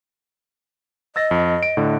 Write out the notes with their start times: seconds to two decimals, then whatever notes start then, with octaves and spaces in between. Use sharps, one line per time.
1.16 D#5 E6 A6 A#6
1.31 F2
1.63 D7
1.77 A2 D3